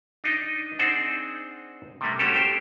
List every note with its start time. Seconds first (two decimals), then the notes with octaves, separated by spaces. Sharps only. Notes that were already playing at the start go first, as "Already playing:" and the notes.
0.24 D4 D#4 D#5
0.79 C4 D4 D#4 G#4 C5 F#5
2.01 C3 G3 A3 A#3
2.19 A3 C#4 F#4 G4 A4
2.34 G4 C5 G5